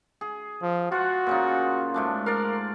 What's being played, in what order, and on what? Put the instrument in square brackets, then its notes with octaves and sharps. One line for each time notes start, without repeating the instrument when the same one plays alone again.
[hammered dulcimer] G#4
[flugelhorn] F3
[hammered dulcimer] F4 F#5 [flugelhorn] F#4
[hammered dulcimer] A#2 C#3 D#4
G#2 A3 D4
[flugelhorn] A#4 [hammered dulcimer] D5 F5